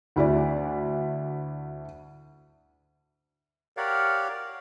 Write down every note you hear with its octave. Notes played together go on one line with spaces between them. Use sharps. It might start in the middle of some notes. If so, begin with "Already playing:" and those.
D2 E4 F#4 D5
G4 A#4 C#5 D5 F5 F#5